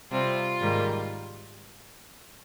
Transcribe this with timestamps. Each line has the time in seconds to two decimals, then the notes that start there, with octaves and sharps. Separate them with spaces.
0.11 C3 G3 C4 F4
0.60 G#2 D#3 G3 A#3